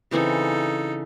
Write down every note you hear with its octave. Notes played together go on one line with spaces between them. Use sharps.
C#3 E3 C4 D#4 A4